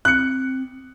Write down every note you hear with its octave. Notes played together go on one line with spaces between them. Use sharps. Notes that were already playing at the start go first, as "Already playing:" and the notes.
C4 F#6 C#7